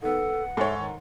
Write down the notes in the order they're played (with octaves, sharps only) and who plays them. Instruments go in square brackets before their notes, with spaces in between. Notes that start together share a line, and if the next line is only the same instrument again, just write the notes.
[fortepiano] D#3 B3 [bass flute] A4 [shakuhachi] F#5
[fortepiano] G#2 [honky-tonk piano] A4 C#5 [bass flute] E5
[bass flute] D#3